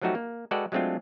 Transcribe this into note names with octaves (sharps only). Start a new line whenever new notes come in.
F3 F#3 A3 D#4 F#4 G4
A#3
G#3 F#4 A4 B4 D5 G5
F#3 G#3 A3 C4 D4 F4